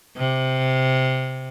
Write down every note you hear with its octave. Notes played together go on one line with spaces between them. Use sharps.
C3